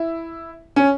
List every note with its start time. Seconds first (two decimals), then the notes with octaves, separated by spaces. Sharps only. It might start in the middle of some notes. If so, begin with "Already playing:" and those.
Already playing: E4
0.76 C#4